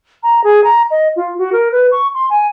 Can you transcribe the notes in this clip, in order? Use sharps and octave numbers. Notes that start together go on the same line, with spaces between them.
A#5
G#4
A#5
D#5
F4
F#4
A#4
B4
C#6
C6
G#5